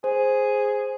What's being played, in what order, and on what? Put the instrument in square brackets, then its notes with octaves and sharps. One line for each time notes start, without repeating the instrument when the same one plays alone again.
[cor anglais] G#4 [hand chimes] C5